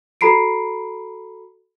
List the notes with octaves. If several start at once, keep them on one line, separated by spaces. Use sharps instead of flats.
F#4 A4 A#5 B5 C7 D7